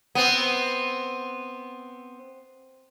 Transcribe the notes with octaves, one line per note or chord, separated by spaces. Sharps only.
B3 C4